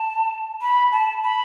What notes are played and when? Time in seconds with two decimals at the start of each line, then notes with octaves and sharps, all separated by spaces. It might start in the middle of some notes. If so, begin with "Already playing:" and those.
Already playing: A5
0.61 B5
0.92 A5
1.23 B5